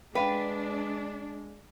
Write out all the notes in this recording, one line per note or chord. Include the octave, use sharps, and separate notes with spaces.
G#3 D4 B4 F5 G5